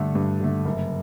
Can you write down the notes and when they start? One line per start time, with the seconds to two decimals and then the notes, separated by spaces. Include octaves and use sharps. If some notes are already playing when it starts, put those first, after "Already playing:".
Already playing: G2 D3 A3
0.15 G2
0.40 D3 A3
0.65 F#1